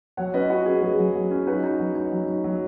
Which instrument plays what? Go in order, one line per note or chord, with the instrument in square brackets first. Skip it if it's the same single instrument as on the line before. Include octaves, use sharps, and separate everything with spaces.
[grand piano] F#3 C#5 F#5
C#4 B4 D#5
C#4 F#4 B4
C#4 G#4
F#3 G#4
F#3
F#3
C#4
D#4 F#4 B4
D#4
F#3
D#4
F#3
D#4
F#3